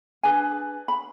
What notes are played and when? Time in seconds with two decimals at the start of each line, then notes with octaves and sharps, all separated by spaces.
0.23 D4 G#4 B4 G#5
0.88 B5